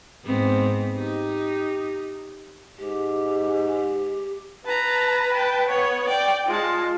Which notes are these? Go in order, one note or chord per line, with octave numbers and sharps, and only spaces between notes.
G#2 B3 C4
D#4 G4
G#2 G4
B4 A5 A#5
G5 A5
B3 C#5
D5 G5
G#3 F4 A5